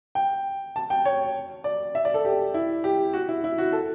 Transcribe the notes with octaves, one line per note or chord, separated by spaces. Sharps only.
G5
A5
G5
C#5
D5
E5
D5
A4
G4
E4
G4
F#4
E4
E4
F#4
A4